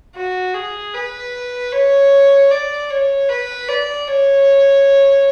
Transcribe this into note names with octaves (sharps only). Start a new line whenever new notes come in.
F#4
G#4
B4
C#5
D5
C#5
B4
D5
C#5